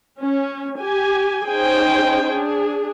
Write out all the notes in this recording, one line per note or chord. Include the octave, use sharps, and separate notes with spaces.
C#4
G4 G#5
C#4 D#4 G#4 C5 G5 G#5
D4 G#4